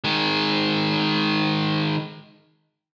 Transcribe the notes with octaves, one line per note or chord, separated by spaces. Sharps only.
D#3 G#3